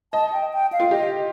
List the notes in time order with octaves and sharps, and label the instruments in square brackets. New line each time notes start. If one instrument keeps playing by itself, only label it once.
[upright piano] D#5 [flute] A5
[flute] G5
G5
F5
[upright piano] F4
[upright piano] G4 [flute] D#5